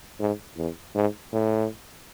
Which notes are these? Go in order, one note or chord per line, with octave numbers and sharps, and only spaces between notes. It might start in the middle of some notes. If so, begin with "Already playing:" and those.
G#2
E2
G#2
A2